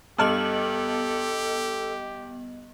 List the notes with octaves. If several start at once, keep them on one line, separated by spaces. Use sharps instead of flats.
G2 B3 G4 A4 D#5 A5 F6 F#7